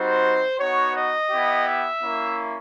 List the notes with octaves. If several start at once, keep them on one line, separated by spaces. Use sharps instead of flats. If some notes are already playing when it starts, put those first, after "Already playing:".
Already playing: G3 C4 D#4 F#4 C5
B3 D#4 F#4 C#5
D#5
B3 E4 G4
E5
A#3 C#4 E4